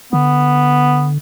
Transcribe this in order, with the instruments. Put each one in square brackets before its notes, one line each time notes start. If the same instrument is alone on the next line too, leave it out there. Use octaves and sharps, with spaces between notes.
[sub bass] D3 [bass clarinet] B3